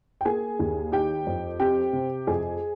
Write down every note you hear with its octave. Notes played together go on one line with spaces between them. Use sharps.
G5
A#3 G#4 G#5
D#2
D#4 G4 G5
F2
C4 G4 G5
C3
F2 G#4 G#5